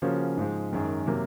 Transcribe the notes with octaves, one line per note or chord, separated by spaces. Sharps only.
C#3 F3 A#3 C#4 F#4
G#2 F3 G#3
F#2 D#3 G#3
C3 F#3 A#3